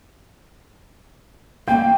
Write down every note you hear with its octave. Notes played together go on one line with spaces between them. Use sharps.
A#3 G5